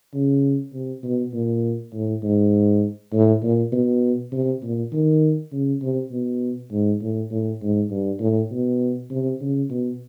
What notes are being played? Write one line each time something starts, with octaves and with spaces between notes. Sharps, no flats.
C#3
C3
B2
A#2
A2
G#2
A2
A#2
B2
C3
A#2
D#3
C#3
C3
B2
G#2
A2
A2
G#2
G2
A2
B2
C3
C#3
B2